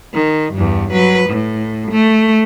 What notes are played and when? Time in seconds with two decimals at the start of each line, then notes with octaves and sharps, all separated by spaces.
0.14 D#3
0.54 E2 G2
0.92 F#3 B4
1.30 A2
1.91 A3